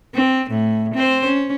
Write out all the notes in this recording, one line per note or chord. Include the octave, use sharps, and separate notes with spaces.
C4
A2
C4 C5
C#4